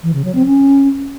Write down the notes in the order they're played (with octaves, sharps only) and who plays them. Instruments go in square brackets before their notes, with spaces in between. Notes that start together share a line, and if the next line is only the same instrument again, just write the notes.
[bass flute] E3
C#3
F#3
C4
C#4